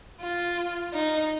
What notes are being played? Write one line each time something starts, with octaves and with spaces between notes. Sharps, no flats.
F4
D#4